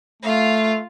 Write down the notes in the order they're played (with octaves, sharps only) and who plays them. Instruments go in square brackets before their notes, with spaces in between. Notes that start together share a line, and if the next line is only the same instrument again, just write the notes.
[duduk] A3 [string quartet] F4 F5